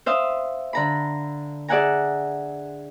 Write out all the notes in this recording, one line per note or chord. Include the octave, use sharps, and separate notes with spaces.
C5 E5 F5 D#6
D3 A#5 B5
G#4 D5 E5 F#5 G#5 A#5